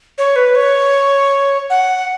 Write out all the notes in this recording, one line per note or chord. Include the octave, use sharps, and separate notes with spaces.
C#5
B4
C#5
F#5